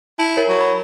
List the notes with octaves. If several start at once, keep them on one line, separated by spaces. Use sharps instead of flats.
E4 A5
A#4 C#5
F#3
B5